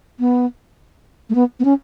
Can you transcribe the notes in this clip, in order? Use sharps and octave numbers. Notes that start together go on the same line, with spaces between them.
B3
A3
B3
B3
C#4